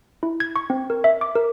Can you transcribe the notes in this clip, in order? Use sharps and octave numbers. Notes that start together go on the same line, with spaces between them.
E4
G#6
C#6
C4
A#4
E5
D6
A#4